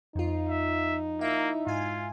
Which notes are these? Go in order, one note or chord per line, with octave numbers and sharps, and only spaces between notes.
F2 D#4 F4
E5
A#3 E4 E5
G#2 F4 G#5